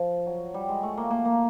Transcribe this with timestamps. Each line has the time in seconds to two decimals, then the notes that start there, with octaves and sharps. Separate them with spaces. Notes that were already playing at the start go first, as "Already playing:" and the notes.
Already playing: F3
0.26 F#3
0.54 G3
0.69 G#3
0.83 A3
0.97 A#3
1.11 A#3
1.25 A#3